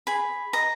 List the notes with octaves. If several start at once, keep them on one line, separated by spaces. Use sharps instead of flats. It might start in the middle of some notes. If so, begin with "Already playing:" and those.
G#4 B5
D#5 A#5